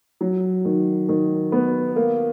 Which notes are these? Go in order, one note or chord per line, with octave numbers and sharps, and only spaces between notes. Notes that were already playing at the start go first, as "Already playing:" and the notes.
F#3
D#3
D#3
B3
A#3